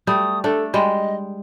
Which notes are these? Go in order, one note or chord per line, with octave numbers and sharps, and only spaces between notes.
G3 A3 D#6
A3 D4 A4
G3 G#3 D#5